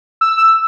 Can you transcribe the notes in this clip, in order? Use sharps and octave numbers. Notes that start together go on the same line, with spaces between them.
E6